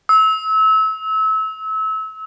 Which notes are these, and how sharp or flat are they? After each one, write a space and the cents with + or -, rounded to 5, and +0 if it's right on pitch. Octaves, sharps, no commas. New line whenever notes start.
E6 -30